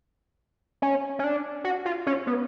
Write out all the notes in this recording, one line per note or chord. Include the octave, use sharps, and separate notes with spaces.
C#4
C#4
D4
F#4
F4
C#4
B3